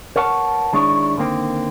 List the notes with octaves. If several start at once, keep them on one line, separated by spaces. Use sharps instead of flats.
A#4 B4 C#5 F#5 A5
D#3 G#3 D4 E4 C#5
D3 D#3 A#3 C4